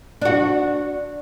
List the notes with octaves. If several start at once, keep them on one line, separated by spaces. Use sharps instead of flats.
D4 F#4